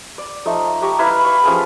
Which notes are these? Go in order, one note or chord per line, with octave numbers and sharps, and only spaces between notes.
D5
F3 A3 D#4
G4 A#5 C#6
E4 B4 F5
F5 B5 C#6
F3 C#4 G#4 A4